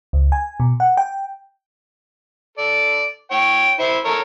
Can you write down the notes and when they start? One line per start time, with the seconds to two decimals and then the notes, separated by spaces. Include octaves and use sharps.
0.13 C#2
0.32 G#5
0.60 B2
0.80 F#5
0.97 G5
2.58 A4 D5
3.31 C#5 G5
3.80 E4 C5 E5
4.05 A4 A#4 C#5